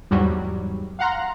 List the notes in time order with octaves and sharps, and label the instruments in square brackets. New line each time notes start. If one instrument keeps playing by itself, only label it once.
[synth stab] E2 G#2 F#3 G3
F5 F#5 A#5 C6